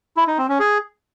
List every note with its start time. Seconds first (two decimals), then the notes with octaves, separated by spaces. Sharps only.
0.17 E4
0.27 D#4
0.38 C4
0.49 C#4
0.60 G#4